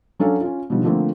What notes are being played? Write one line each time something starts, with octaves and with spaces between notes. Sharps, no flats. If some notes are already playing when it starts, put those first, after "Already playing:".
F#3 C#4 D4 A4 C#5 F5
C#4 F4
B2 D3 D#3 F3 G3
D3 F3 A3 A#3 C4